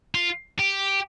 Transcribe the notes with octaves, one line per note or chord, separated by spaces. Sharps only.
F4
G4